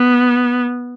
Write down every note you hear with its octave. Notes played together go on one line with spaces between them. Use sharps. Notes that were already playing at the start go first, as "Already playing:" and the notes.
Already playing: B3